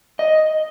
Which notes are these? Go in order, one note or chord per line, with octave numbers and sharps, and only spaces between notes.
D#5